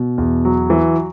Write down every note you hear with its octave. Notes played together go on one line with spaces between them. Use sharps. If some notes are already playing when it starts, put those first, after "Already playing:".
Already playing: B2
E2
F#3
E3